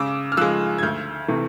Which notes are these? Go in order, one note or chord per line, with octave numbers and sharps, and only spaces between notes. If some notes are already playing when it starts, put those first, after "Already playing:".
Already playing: C#3 D6 E6
F6
F3 G#3 E6 F#6
G#6
D2 F6 G6
C3 E3 A3